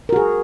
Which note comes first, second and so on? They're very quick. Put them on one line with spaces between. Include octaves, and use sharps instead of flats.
A#4 F#4 G#4